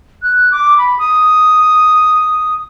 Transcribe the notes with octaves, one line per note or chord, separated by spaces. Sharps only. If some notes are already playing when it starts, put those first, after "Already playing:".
F#6
D6
B5
D#6